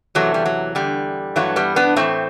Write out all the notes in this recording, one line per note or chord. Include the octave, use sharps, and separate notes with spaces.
E2 C3 E3 F#3 A3
G3
F#3
E2 D3 G3
G2 E3 F#3 A3
G3 B3
B3 D4
A2 E3 A3 C4